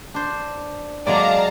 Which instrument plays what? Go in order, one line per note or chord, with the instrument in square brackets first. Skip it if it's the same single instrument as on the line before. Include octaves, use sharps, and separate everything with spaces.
[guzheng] D4 C5
[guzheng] F#3 G#3 A#3 [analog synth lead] D5 [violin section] F5 A5 A#5